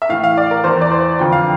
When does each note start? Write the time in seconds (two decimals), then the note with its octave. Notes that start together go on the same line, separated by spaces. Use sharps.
0.02 E5
0.09 A2 E3 F5
0.24 F5
0.37 D5
0.51 A#4
0.64 E2 E3 C5
0.81 D5
0.91 C5
1.19 F2 D3 F3 G5
1.32 F5